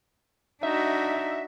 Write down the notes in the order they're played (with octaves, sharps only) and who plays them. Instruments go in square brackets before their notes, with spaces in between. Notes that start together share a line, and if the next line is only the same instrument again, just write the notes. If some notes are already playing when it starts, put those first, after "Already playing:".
[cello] D4 F#4 [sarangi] D#4 [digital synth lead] E5